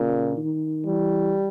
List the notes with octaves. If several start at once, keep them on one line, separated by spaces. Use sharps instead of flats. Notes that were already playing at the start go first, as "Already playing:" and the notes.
Already playing: A#2 C#3
D#3
E3 G3